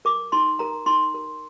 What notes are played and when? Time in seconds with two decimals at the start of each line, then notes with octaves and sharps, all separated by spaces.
0.05 A#4 D6
0.32 D#4 C6
0.59 A#4 A#5
0.86 D#4 C6
1.14 A#4